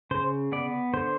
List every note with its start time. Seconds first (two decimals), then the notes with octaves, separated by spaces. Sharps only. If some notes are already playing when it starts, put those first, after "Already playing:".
0.11 C#3 C5
0.52 B3 D5
0.94 D3 C5